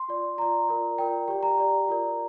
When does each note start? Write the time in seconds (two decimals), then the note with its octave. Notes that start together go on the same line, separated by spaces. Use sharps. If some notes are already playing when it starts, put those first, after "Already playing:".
Already playing: C6
0.09 F4 D5
0.38 F4 D5 A#5
0.68 F4 A#4 D5
0.98 F4 A#4 D5 G5
1.28 G4 D5 G5
1.43 A#5
1.58 G4 D5
1.88 F4 A#4 D5